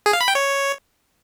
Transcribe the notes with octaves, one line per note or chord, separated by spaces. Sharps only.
G#4
F5
B5
G5
C#5